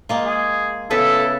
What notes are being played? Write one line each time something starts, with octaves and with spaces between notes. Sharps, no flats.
G#3 A#3 F4
G#4
C#3 B3 E4 A4 B4